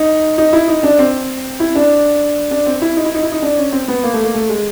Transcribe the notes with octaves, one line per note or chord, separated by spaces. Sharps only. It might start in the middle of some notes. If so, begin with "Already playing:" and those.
Already playing: D#4
D#4
E4
D#4
D4
C4
E4
D4
D4
C4
E4
D#4
E4
D#4
E4
D#4
D4
C#4
C4
B3
A#3
A3
A#3
A3
G#3